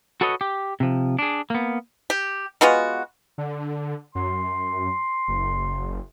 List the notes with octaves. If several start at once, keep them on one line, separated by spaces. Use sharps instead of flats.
F#4 A4 B4 C#5 D#5
G4
C3 F3
D4 G#4
A#3 B3
G4
G#3 B3 F4 F#4
D3
F#2 C6
F#1